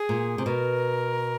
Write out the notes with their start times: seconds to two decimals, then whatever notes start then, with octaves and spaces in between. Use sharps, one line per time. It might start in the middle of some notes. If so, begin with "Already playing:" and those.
Already playing: G#4
0.09 A#2
0.38 C3
0.46 B2 A#4